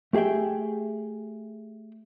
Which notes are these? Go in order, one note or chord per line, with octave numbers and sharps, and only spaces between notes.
A3 G4 G#4 E5 G5